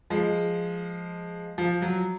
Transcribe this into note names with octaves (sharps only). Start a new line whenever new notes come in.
F3 G#3
F3
F#3